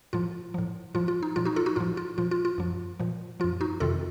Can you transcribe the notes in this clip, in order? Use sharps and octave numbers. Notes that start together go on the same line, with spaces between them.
A2 F3 F4
A2 F3
A2 F3 F4
F4
D#4
A#2 F3 F4
D#4 F#4
F4 A4
D#4 F#4
A2 F3 F4
F4
A#2 F3 F4
F4
F4
F#2 F3
A#2 F3
F#2 F3 F4
D#4 F#4
F2 C3 D#3 F4 A4